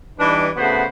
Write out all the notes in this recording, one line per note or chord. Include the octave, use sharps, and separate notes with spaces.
E3 G3 D4 D#4 B4
C#3 A3 B3 F#4 C5 B5